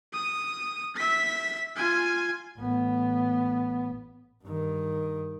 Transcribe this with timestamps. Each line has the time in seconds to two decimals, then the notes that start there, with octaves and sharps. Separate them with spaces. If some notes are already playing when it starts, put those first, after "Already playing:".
0.13 D#6
0.96 E5 B6
1.76 F4 G#5
2.58 A1 B3
4.45 G2 D#3